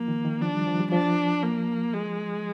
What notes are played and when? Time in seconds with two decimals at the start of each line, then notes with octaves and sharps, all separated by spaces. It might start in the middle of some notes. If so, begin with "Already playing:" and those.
Already playing: F3 A#3
0.08 D#3
0.25 D#3
0.41 F3 D4
0.54 G3
0.67 F3
0.80 G3
0.92 F3 D4
1.43 A#3
1.93 G#3